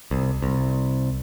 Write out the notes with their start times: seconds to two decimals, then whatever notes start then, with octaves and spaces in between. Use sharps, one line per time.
0.11 C2
0.42 C2